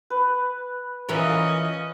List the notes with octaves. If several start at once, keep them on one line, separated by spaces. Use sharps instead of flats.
B4
E3 C#4 F4 A#4 D#5